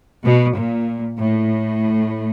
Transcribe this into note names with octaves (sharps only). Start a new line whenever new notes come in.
B2
A#2
A2